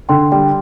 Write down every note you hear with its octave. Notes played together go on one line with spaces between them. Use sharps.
D3 G5 C6
G3 G5 C6